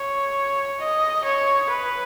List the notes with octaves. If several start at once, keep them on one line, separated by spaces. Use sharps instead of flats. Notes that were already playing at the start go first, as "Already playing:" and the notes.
Already playing: C#5
D#5
C#5
B4